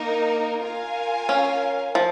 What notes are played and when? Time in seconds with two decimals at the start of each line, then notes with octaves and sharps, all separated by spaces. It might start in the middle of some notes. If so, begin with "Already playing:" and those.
Already playing: A#3 D#4 A#4
0.62 F4 A#4 F5 G#5
1.29 C#4
1.95 F3